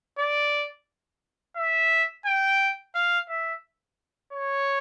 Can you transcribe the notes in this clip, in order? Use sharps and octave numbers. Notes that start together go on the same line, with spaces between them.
D5
E5
G5
F5
E5
C#5